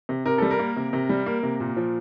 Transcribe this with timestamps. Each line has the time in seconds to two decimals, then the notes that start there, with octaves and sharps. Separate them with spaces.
0.09 C3
0.25 C3 A#4
0.38 G3 A4
0.51 A#4
0.59 A#3
0.76 C3
0.93 C3
1.09 G3
1.26 A#3
1.43 C3
1.60 A#2
1.77 F3